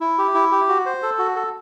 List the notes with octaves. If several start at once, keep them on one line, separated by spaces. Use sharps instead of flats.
E4
G4
E4
G4
F#4
C5
A4
F#4
A4